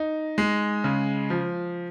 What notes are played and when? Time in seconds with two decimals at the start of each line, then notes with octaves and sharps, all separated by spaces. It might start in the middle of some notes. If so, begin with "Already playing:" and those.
Already playing: D#4
0.38 G#3
0.84 C#3
1.30 F3